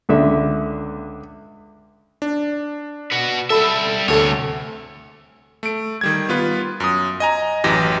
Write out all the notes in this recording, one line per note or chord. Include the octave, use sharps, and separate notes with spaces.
C#2 D3 E5
D4
F#4 B4
G3 A4 E5 B5
D2 C3 A4 C#5
A3 D7
D#3 G3 G#6
B3 F4 B4
F#2 D#6
D#5 G#5 A#5
A1 F#2 E3 G4 D#5 A#6